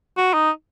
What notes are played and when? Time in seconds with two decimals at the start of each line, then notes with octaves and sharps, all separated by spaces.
0.17 F#4
0.33 D#4